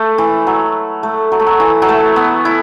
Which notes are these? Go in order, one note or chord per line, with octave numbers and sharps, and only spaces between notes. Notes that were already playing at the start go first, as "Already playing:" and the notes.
Already playing: A3
E3
F#3
A3
F#3
A3
F#3
E3
F#3
A3
B3
E4